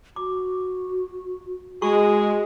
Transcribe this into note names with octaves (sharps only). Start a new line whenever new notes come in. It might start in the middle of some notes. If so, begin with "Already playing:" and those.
F#4 D6
G#3 F#4 G#4 C#6